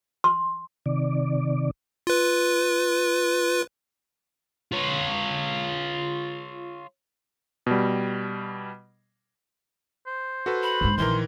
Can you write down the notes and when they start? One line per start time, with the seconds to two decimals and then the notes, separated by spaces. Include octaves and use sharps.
0.24 C6
0.86 C3 D#3 D5
2.07 F4 B4
4.72 F4 C#5
7.67 B2 G3
10.07 C5
10.46 F#4 A4 B4
10.63 B5
10.81 G1 G#2
10.98 A#1 D#3 E3 A#4 C6